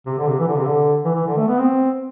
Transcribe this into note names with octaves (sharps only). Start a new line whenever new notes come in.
C3
D3
C3
E3
D3
C3
D3
E3
E3
D3
A3
B3
C4